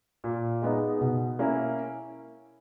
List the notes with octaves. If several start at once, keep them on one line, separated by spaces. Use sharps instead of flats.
A#2
G#3 B3 D#4
B2
A#3 C#4 E4